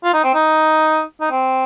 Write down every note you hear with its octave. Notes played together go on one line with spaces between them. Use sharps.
F4
D#4
C4
D#4
D#4
C4